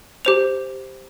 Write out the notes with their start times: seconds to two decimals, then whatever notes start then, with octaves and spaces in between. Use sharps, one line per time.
0.25 G4 C5 F7